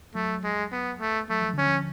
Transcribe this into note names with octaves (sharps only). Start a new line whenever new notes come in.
F#3 A3
G#3
B3
A3
F#3 A3
F3
D3 C#4
F3